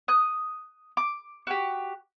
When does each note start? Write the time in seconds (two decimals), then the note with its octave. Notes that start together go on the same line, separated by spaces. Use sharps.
0.08 D#6 F#6
0.97 D6
1.47 F#4 G4